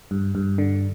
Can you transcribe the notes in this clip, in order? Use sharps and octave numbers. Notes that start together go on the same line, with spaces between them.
G2
G2
D3